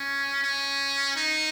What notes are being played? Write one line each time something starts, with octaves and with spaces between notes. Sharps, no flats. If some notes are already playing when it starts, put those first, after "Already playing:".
Already playing: C#4
C#4
D#4